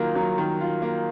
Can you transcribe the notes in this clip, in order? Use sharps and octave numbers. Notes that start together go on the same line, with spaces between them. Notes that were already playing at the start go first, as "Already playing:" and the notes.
Already playing: D#3 F#3 A#3 F4
F#3
D#3
F4
A#3